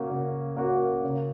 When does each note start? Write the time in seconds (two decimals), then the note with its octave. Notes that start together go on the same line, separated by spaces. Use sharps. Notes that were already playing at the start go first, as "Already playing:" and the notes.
Already playing: C#3 A#3 C#4 F#4 A#4
0.10 C#3
0.57 A#3 C#4 F#4 A#4
1.04 C#3